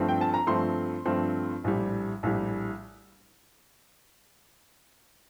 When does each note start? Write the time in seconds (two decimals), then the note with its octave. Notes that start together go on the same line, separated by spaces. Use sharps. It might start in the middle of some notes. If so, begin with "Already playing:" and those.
Already playing: G2 F3 A3 C4
0.09 G5
0.21 A5
0.34 A#5
0.47 G2 F3 A3 C4 C6
1.06 G2 F3 A3 C4
1.64 A#1 A2 G3
2.23 A#1 A2 G3